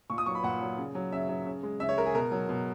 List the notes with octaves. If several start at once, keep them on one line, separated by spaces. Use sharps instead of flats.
A#2 C#6
D#6
F#3 C#6
B5
A#2 F#5
F#3
C#3
F#3
C#3 E5
F#3
C#3
G#3
C#3 E5
C#5
G#3 A#4
G#4
B2 A#4
F#3
B2